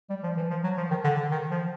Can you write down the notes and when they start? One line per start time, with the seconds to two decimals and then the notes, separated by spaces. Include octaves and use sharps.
0.10 G3
0.24 F3
0.37 E3
0.50 F3
0.64 F#3
0.77 F3
0.91 D#3
1.04 D3
1.17 D3
1.31 D#3
1.51 F3